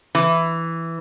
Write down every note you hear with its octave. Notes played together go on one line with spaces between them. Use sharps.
E3